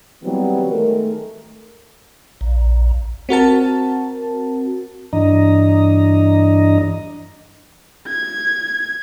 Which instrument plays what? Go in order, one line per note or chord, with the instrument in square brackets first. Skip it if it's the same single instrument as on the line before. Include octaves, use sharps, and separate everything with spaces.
[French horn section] C#3 E3 F#3 G3 B3 C4
D#3 G#3 A3 A#4
[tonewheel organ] A#1
[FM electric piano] C4 F#4 A#4 A5
[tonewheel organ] G2 E3 D4 D#5 A#5
[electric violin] G#6